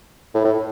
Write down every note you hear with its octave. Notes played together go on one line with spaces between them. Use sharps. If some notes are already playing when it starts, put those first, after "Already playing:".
A2
A2